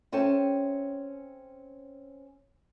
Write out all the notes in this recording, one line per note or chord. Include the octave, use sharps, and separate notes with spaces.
C4 C#4 A4 E5 G5 A5